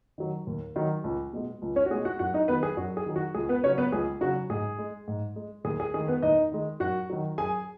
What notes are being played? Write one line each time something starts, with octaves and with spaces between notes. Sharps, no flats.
D#3 F#3
D#2
D#3 F#3
C#2
B2 G#3
C#2
C#4 C#5
F#4
B2 G#3 G#4
F#4 F#5
F#2 F#4 F#5
D#4 D#5
D#3 F#3 B3 B4
G#4
F#2 F#4
G#4
D#3 F#3
F#4
C#2 G#4
B3 B4
C#3 F#3 C#4 C#5
B3 B4
C#2 G#4
C#3 F#3 F#4
G#2 G#4
G#3
G#2
G#3
D#2 G#4
G#4
D#3 G#3 G#4
B3 B4
D#2 D#4 D#5
D#3 G#3
F#2 F#4 F#5
D#3 F#3
F#2 G#4 G#5